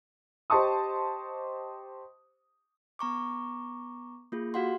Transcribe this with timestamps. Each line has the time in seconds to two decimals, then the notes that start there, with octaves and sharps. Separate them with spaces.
0.50 G4 C5 D#5 A5 C#6 D#6
2.99 B3 A#5 C#6 D6
4.32 A#3 F4 G#4
4.54 F#4 G4 F5 F#5 C6